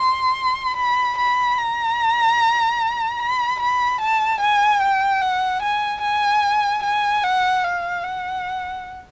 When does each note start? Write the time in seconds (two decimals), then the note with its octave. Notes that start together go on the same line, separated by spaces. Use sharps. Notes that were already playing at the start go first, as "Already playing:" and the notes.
Already playing: C6
0.77 B5
1.18 B5
1.58 A#5
3.20 B5
3.60 B5
4.01 A5
4.40 G#5
4.81 G5
5.22 F#5
5.62 G#5
6.02 G#5
6.83 G#5
7.23 F#5
7.64 F5
8.04 F#5